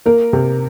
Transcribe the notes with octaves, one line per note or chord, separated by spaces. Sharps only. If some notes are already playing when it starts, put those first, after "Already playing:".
A#3 A#4
C3